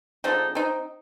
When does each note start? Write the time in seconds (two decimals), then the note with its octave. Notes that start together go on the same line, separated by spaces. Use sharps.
0.24 D3 F3 G#3 C4 D#4
0.55 C4 D#4